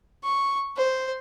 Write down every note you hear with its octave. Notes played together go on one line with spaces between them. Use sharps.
C#6
C5